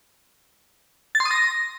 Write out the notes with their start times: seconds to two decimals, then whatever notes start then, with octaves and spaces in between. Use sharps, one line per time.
1.15 A6
1.20 C6
1.25 D#6
1.31 A#6